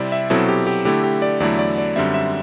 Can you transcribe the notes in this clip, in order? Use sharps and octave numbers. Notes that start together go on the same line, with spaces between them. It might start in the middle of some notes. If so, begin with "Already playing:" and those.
Already playing: C3 G3 C4 E4 D5
E5
B2 F#3 C4 E4 A4
G4
G4
D3 A3 E4 G4
G4
D5
E2 D3 F#3 A3 E4 D5
D5
D5
F#2 D3 G3 C4 E5
E5